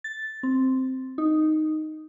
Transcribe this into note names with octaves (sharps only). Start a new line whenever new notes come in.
A6
C4
D#4